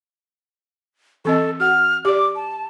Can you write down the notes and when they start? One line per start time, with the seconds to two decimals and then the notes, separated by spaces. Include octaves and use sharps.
1.25 E3 C4 A4 D#5
1.60 F#4 F#5 F6
2.05 G4 D5 D6
2.35 A5